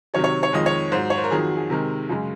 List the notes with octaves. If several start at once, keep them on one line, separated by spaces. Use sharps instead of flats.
C3 D#3 F#3 C#5
C#5
C#5
F2 D#3 G#3 D#5
C#5
G#2 C5
F#3
C#5
C5
A#4
F2 D#3 F#3 G#4
F#4
G#4
C3 D#3 G#3 A#4
F#2 C#3 G#3